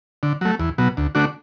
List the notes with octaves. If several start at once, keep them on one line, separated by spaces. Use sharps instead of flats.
D3
F#3 A3
E2
B2 F#3
D2
D3 A3 D4 F#4